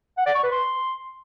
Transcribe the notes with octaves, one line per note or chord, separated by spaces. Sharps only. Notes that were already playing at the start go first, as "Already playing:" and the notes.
F#5
D5
C#6
B4
C6